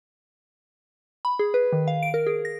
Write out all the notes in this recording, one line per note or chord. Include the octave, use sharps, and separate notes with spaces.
B5
G#4
B4
D#3
F5
D7
A#4
G#4
A#6